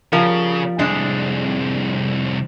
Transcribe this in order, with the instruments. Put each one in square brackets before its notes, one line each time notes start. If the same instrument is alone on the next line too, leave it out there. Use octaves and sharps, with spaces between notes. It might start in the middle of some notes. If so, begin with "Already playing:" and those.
[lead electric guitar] C#3 [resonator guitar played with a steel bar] F3 G3 A#4
[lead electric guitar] C2 F2 [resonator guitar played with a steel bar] G#3 D4